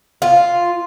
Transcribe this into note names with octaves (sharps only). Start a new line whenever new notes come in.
F4